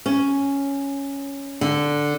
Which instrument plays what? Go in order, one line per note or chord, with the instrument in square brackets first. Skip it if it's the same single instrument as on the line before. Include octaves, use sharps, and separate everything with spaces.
[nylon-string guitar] C#4
D3